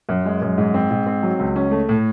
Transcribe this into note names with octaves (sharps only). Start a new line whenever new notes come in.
F#2
G#3
F#2
G#2
C4
G#2
C4
F#3
C#2
C#4
A3
A2